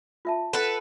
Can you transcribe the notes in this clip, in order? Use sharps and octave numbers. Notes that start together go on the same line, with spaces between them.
F4 E5 A5
A4 B4 F#5